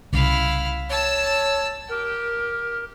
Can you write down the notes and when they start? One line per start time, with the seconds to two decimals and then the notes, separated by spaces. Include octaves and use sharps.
0.13 C2 C#3 E4 F5
0.89 C#5 A5 E6
1.89 G4 A#4